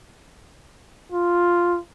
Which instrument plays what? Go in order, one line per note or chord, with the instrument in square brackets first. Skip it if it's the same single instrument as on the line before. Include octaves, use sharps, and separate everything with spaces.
[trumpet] F4